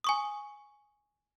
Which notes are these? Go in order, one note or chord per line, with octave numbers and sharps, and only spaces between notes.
G#5 C#6 D#6